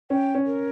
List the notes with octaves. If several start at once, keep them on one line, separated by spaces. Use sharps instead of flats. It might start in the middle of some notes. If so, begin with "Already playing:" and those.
C#4 G5
C#4
A#4